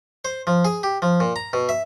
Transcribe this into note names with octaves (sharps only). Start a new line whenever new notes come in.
C5
F3
G#4
G4
F3
A#2
A#5
B2
E5